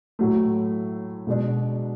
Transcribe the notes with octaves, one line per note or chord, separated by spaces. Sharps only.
A2 F#3 A3
B2 G#3 D4